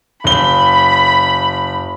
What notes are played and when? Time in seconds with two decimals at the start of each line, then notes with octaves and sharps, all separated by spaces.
0.24 F#1 B5 G7